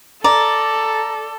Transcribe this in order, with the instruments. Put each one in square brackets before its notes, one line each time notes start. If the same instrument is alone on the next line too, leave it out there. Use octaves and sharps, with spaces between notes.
[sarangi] A4 [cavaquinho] D5 [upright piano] A#5